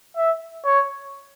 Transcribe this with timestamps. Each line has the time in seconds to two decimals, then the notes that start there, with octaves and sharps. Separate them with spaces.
0.17 E5
0.65 C#5